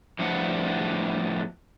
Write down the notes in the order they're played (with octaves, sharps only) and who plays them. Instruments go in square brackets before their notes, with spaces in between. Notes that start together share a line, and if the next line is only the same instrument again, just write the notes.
[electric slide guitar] A2 F3 G3 B3 D4 F#5